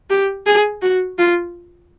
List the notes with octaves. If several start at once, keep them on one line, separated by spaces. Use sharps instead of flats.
G4
G#4
F#4
F4